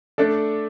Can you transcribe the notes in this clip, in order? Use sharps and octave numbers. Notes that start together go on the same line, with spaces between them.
A3 D4 A4 D5